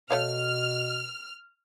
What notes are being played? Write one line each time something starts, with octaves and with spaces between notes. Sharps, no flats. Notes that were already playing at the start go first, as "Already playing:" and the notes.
B2 A3 C#5 F5 F6